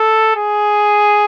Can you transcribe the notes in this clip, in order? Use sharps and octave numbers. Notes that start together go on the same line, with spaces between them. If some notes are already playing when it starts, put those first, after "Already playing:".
Already playing: A4
G#4